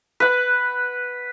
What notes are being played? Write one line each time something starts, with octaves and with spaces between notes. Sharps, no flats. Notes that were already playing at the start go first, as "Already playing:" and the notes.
B4 F#5